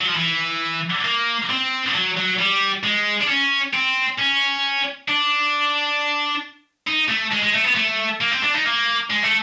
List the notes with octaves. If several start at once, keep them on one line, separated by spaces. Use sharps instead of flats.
F#3
F3
E3
A#3
C4
F#3
F#3
G3
G#3
D4
C#4
C4
C#4
D4
D#4
A3
G#3
G#3
A3
B3
A3
A#3
C4
D4
D#4
A#3
G#3
A3